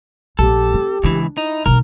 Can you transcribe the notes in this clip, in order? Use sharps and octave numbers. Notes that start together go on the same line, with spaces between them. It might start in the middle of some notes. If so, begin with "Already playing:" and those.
A#1 F3 G4 A4
C4
C#2 E3 D4
D#4 E4
B1 G#3 A#4